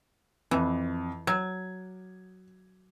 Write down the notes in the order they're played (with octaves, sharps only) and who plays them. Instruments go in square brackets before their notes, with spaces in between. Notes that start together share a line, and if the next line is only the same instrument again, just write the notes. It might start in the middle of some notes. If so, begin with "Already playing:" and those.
[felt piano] F2 [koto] E3
[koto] F#3 [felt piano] G#6